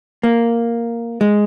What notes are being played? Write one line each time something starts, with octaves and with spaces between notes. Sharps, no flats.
A#3
G#3